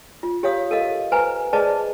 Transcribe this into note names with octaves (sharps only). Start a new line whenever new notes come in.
F4
G4 C#5 F5 D#6
A4 A#4 D#5 F5
B4 C5 G#5 A#5
G#4 B4 C5 D5 D#5 A5